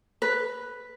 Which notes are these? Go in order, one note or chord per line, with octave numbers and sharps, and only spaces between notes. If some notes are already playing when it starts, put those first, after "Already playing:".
B4